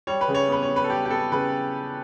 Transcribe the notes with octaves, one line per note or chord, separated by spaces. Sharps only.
G3 C#5
B4
C#3
C#5
B3 B4
C#5
B3
B4
A4
G3 G4
G4
B3 A4
C#3 B4